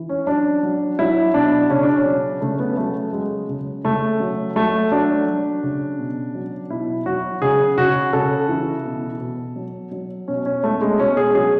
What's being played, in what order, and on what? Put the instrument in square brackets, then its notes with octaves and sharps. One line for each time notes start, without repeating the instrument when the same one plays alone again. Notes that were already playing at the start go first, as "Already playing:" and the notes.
Already playing: [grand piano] E3
C#4
F#3 D4
F#3
F#3 E4
B2 D4
C#3 C#4
D4
C#4
F#3
C#3 A3
B3
F#3 A3
F#3 G#3
C#3
C#3 A3
F#3
F#3 A3
F#3 D4
F#3
C#3
B2
F#3
B2 E4
F#3 F#4
C#3 G#4
C#3 F#4
C#3 A4
E3
B2
B2
F#3
F#3
B2 C#4
C#4
B2 A3
G#3
B2 C#4
G#4
F#3 G#4